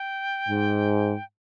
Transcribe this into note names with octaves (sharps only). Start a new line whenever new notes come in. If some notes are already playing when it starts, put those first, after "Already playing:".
Already playing: G5
G#2